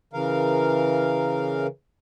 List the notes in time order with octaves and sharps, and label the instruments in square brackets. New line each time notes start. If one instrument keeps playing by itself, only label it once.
[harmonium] C#3 E3 A#4 F5